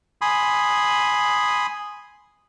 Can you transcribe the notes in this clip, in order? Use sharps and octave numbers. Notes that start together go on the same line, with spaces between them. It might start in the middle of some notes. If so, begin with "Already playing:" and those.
G#5 B5 C6 D#6